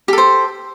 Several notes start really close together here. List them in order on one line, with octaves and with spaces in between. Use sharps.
G4 A4 C5